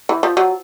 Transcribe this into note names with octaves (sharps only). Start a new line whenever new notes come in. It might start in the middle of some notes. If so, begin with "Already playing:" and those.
E3
F3
F#3